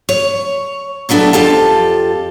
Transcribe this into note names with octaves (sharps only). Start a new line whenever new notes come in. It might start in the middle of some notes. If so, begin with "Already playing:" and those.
C#5
F#3 G3 B3 D4 E4 A4
F2 F4 G4 A4 A5